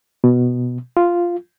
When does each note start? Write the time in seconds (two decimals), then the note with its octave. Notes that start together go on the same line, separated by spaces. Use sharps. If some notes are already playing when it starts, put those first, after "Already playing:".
0.24 B2
0.97 F4